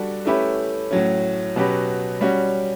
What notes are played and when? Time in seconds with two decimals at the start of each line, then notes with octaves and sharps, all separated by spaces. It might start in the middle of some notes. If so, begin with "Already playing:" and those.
Already playing: G3 D4 F#4 A4
0.25 A3 C#4 E4 G4 B4
0.91 A2 F#3 C#4
1.56 B2 F#3 C#4 G4 B4
2.21 G3 C#4 F#4